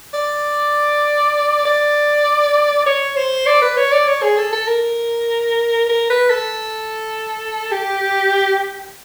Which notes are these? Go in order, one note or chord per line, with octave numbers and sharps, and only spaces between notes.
D5
D5
C#5
C5
D5
B4
C#5
D5
C#5
G#4
A4
A4
A#4
A#4
B4
A4
G4